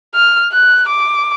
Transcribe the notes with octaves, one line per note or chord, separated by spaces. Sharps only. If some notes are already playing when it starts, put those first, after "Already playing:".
F6
F#6
D6